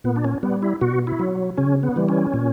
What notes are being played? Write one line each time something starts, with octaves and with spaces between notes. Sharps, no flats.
A#2 B3
D4
C#4
G3 B3
E4
B2 F#4
E4
F#3
C#3 C#4
B3
E3 G3
C#4
A#2